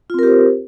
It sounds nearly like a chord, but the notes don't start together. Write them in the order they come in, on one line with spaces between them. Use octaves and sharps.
F4 C4 A#4 G4 C5